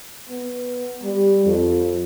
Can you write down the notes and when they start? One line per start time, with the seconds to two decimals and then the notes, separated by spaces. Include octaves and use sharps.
0.30 B3
1.04 G3
1.45 F2